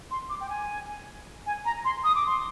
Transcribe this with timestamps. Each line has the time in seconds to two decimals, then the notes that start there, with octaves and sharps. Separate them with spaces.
0.11 C6
0.29 D6
0.41 G5
0.50 G#5
1.46 G#5
1.65 A#5
1.85 C6
2.04 D#6
2.15 D6
2.26 C6